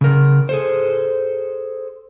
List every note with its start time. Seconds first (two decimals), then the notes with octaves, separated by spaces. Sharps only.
0.01 C#3 A#4
0.49 G#4 A4 C5